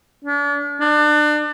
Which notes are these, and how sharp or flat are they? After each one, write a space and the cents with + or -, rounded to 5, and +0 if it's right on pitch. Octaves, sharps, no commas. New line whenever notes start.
D4 -40
D4 +30